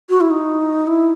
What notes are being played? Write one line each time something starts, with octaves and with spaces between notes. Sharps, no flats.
F#4
E4
D#4
E4